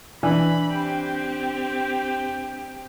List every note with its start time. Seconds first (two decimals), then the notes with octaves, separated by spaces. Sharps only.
0.23 E3 D4 B5
0.70 C4 G4